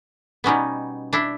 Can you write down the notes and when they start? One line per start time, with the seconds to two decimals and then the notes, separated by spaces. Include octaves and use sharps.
0.44 B2 G3 B3 C#4 D#4
1.13 D4 E4